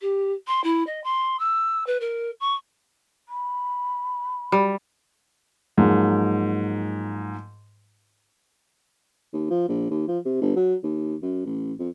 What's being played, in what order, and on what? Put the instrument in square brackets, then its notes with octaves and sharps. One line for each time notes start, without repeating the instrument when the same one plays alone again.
[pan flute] G4
C6
E4
D#5
C6
E6
B4
A#4
C#6
[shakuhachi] B5
[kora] G3
[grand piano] G#2 F3 F#3 G#3 A#3
[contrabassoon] D#2
F3
A#1
D#2
F3
C3
G1
F#3
D#2
F#2
A1
F2